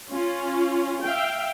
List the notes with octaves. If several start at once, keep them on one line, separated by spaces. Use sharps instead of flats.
C#4 F4
E5 F5 G5